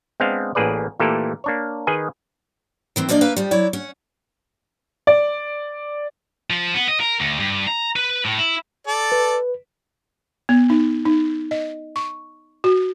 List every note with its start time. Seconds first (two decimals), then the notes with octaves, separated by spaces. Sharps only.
0.20 G#3 B3 C4 D4 F5
0.55 A1 A2 A#3 G#4 B4 D5
1.00 A#2 E3 A3 A#3 G4 A4
1.44 A#3 D4 C#5
1.87 D#3 G#4 B4 D#5 G#5
2.96 D#3 E3 C4
3.09 F3 A#3 D4 D5 D#5
3.21 A#3 B4 E5 F5
3.36 F3 G3
3.51 F#3 E4 C#5 D5
3.73 C#4 F#5
5.07 D5
6.50 F3
6.74 B3
6.88 D#5
7.00 A#4
7.20 D2
7.40 G2
7.67 A#5
7.96 B4
8.25 A2
8.38 E4
8.87 A4 D5
9.12 B4
10.49 B3
10.70 D#4
11.05 D#4
11.51 D#5
11.96 C#6
12.64 F#4